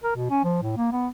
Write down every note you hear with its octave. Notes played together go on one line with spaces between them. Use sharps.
A#4
B2
C#4
F3
A2
A#3
B3